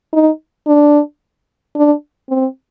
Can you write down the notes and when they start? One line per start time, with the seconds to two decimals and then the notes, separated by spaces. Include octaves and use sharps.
0.13 D#4
0.67 D4
1.76 D4
2.29 C4